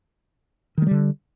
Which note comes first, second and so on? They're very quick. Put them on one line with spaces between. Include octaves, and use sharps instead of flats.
D#3 G#3 G3 D3